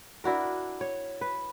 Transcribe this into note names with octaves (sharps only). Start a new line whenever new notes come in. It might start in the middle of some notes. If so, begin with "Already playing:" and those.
D4 E4 F#4 A#4
C#5
B4